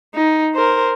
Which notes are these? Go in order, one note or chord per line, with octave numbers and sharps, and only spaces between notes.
D#4
A#4 C5